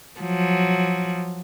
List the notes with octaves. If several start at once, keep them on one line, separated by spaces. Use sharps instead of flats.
F3 F#3